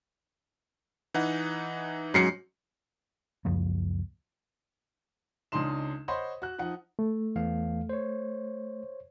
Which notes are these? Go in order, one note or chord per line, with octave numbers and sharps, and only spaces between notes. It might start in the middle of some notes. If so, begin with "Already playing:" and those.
E3 D#4 F#5
G#2 F#3 C#4 C7 C#7
C#2 F#2 F3 A#3
C#2 C#3 D4 D#4 C6 E7
C5 C#5 D#5 F#5 B5 C6
F#4 F#6
F3 D#4 F#5
A3
E2 E3 F5
C5 C#5